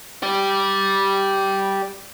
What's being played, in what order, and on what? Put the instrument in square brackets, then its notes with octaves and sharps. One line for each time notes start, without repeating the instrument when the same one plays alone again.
[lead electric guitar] G4 D5